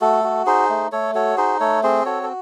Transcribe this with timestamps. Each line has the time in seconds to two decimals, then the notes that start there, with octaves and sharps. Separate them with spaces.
0.01 A3 F#4 A4
0.24 F#4
0.46 D#4 G#4 C5
0.69 A3
0.92 A3 A4 C#5
1.15 F#4 A4 C#5
1.37 D#4 G#4 C5
1.60 A3 A4 C#5
1.83 C4 G#4 C5
2.05 F#4 A4 C#5
2.23 A4